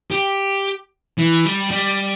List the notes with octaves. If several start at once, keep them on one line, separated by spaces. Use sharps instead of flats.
G4
E3
G3
G3